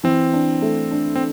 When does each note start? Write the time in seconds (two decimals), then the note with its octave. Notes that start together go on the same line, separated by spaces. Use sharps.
0.03 E3 C4
0.33 D4
0.62 A3
0.91 D4
1.15 C4